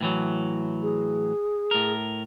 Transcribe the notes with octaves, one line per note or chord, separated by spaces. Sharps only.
A2 E3 F#3
G#4
A2 A#4